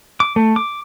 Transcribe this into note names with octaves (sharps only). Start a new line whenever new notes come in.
D6
A3
D6